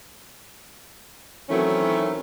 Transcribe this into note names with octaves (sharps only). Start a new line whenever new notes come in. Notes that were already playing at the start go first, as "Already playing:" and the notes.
D#3 E3 F#3 A3 C4 C#4